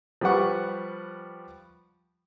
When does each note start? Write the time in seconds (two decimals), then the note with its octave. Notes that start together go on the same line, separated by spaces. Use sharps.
0.21 F3 G3 G4 B4 F#5 C#6